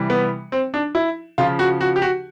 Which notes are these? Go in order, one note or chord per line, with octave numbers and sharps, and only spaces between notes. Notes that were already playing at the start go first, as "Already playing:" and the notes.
Already playing: C3 E3 G3
B3
C4
D4
E4
C#3 F3 F4
F#4
F#4
G4
F#4